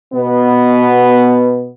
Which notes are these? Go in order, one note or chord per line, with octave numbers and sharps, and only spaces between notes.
B2 B3